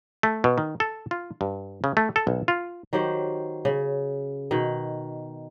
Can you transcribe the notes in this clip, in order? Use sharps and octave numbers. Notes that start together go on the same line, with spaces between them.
A3
B2
D#3
A4
F4
G2
C#3
A3
A4
B1
F4
D#3 F#3 G4 C5
C#3
B2 D#3